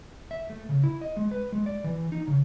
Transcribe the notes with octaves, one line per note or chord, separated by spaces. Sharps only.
E5
A3
C#3
E4
D#5
G#3
B4
G#3
D5
E3
D#4
C#3